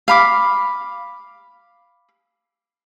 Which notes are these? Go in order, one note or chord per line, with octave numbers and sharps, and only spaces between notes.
F5 B5 D6